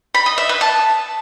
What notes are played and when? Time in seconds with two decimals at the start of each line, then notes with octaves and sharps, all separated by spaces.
0.15 B5
0.26 D#5
0.38 E5
0.49 B4
0.61 A5